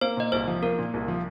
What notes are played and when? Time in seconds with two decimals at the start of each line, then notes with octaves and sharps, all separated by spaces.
0.01 A#3 C5
0.17 A#2 D#5
0.32 C2 C5
0.48 F3
0.62 A#3 A#4
0.79 A#2
0.94 C2
1.08 F3